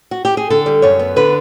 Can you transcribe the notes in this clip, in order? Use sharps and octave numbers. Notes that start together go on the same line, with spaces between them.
F#4
G4
G#4
D3 A4
G3
F#2 C#5
B3
D3 B4